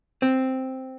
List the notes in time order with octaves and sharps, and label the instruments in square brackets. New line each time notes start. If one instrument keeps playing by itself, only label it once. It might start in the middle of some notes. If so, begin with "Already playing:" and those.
[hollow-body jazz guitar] C4